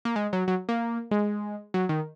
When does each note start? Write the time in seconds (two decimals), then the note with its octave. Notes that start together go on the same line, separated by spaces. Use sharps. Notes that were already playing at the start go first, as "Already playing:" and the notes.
0.05 A#3
0.16 G#3
0.33 F#3
0.48 F#3
0.69 A#3
1.11 G#3
1.74 F#3
1.89 D#3